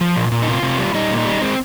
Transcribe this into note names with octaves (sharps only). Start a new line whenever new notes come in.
F3
A#2
A#2
D#4
C3 F4
C3
G3
G3 D#4
A#2
D#4
G3
G#3 C4